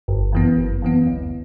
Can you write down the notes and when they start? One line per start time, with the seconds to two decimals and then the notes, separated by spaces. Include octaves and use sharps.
0.08 G1
0.33 F#2 E3 B3
0.57 G1
0.82 F#2 E3 B3
1.07 D2